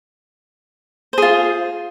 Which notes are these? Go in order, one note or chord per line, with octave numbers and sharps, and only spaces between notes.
F4 G#4 C5